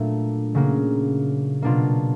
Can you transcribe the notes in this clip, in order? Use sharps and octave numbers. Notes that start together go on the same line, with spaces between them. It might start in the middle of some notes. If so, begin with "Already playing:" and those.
Already playing: A#2 F#3 A3 D4
C#3 F#3 A#3
B2 F#3 A#3 D4 F4